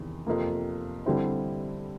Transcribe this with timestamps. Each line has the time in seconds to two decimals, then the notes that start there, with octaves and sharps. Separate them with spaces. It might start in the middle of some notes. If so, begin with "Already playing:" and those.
Already playing: E2 C3 D#3
0.27 F2 C3 F3 A#3
1.06 D3 G3 C4 E4